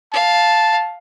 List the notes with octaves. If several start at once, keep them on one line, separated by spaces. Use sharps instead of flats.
F5 A5